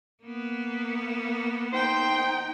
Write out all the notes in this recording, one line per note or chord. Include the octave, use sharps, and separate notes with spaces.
A#3 B3
D#4 C5 G5